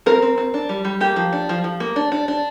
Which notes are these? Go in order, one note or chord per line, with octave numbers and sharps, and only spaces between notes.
C4 A#4
C4
C4
D4
G3
G3
A#3 G4
F3
D4
F3
F3
A#3
D4
D4
D4